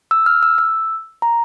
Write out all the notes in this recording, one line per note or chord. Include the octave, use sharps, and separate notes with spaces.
E6
F6
E6
E6
A#5